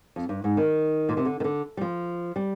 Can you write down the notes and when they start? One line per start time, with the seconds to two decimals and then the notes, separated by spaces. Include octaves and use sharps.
0.16 F2
0.29 G2
0.44 G#2
0.57 D#3
1.09 A#2
1.17 C3
1.25 D3
1.40 D#3
1.44 D3
1.77 G3
1.81 F3
2.36 G3